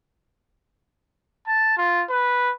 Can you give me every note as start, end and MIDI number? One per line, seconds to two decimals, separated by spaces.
1.47 1.74 81
1.77 2.04 65
2.10 2.51 71